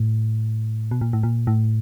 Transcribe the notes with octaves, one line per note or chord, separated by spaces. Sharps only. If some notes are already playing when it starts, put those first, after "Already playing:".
Already playing: A2
B2
A#2
A2
A#2
A2